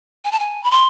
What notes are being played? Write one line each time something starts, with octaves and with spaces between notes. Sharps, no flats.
G#5
A5
G#5
B5
C6